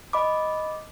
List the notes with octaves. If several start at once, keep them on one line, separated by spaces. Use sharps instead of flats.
D#5 B5 D6